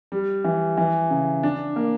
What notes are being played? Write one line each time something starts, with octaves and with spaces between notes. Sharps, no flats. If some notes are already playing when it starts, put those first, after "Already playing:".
G3
E3
E3
C#3
D4
A#3